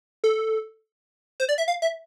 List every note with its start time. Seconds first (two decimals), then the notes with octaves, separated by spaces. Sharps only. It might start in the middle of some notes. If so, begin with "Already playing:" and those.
0.24 A4
1.40 C5
1.49 D5
1.58 E5
1.68 F5
1.82 E5